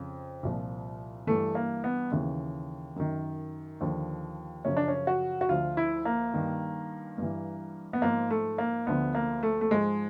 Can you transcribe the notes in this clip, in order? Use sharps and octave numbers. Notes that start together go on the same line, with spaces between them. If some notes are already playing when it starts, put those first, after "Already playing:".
Already playing: F2 C#3 F3
C2 A#2 F3
G2 E3 A3
A#3
B3
D#2 C#3 E3
F#2 D#3
D#2 D3 F3
F#2 C#3 F3 C#4
D4
C#4
F#4
F#4
D2 D3 F3 F4
E4
A#3
G2 D#3
G2 E3
B3
G#2 F3 A#3
A3
A#3
D2 D3 F3 B3
A#3
A3
A3
G#2 F3 G#3